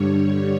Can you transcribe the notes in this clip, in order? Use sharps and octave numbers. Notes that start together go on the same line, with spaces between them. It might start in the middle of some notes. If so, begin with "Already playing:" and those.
Already playing: G2 D3 G3 C#5